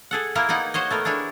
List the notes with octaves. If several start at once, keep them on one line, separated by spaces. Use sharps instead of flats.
G#4 A4 F#5
A#3 E4 G#4 A#4
A#3 B3 D#4 F#5
F#4 C5 C#5 D#5
A3 B3 A#4
D4 E4 G#4 C#5